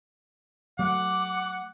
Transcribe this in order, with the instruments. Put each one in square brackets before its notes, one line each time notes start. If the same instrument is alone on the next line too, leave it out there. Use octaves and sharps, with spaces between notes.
[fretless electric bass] F#3 A3 [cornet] F#5 [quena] D6